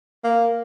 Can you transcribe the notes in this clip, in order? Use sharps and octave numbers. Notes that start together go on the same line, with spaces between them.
A#3